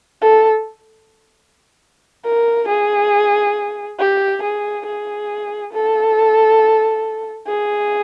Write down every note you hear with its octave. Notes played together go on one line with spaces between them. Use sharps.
A4
A#4
G#4
G4
G#4
G#4
A4
G#4